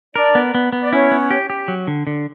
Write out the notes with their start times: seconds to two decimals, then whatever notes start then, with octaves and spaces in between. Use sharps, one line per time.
0.15 D4 A#4 D5
0.35 B3
0.55 B3
0.73 B3
0.83 D5
0.92 C#4 E4 C#5
1.11 B3
1.31 G4
1.50 G4
1.68 F#3
1.87 D3
2.07 D3